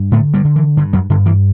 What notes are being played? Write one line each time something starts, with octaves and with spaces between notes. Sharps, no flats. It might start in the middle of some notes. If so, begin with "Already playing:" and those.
Already playing: G2
A2 D3 A3
G2 G3
D3
E3
G2 D3
F#2 F#3
G2 D3
E3